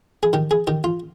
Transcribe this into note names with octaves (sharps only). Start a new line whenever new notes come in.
G#4
D#3 G4
G#4
D#3 G4
F4